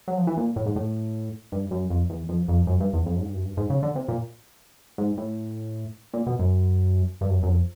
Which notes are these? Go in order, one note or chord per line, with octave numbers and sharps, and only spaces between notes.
F#3
F3
E3
A#2
A2
G#2
A2
G2
F#2
F2
E2
F2
F2
F#2
G2
E2
F2
F#2
G#2
G2
F#2
G2
G#2
C#3
D3
C3
A#2
G#2
A2
A#2
B2
F#2
G2
F#2
F#2
F2